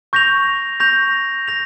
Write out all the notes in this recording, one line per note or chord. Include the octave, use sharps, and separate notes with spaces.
C#6 G6 A#6 F7
C#6 G6 A#6 F7
G6 A#6 F7